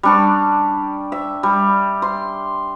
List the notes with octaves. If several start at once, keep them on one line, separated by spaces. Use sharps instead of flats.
G3 D4 C#6
E5
G3
C6